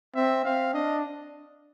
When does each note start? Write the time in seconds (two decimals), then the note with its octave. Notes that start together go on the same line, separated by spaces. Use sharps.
0.15 C4 E5
0.45 C4 F5
0.74 D4 D#5